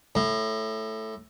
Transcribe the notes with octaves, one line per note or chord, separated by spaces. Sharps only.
A2